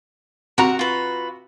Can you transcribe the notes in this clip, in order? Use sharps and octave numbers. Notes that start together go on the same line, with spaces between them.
C3 F#4 A#4 F#5 A#5
F4 B4